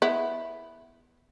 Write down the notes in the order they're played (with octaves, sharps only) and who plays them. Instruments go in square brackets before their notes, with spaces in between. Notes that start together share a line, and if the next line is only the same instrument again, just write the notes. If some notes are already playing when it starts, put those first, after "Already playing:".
[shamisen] B3 E4